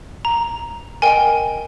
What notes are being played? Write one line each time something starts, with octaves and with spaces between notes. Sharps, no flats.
A#5
A#4 D#5 G5 G#5